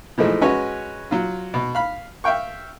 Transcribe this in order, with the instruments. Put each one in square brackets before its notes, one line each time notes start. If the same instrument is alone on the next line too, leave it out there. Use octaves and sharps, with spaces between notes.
[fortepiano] E3 F3 G#3 A3 D#4
G#3 C#4 F#4 B4 C#5
F#3 F4
B2
F5 B5
E5 F5 G5 C#6